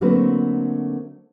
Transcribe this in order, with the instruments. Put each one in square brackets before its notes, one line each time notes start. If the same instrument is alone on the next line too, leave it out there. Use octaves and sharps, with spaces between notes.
[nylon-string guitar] D3 F#3 A3 A#3 C4 B4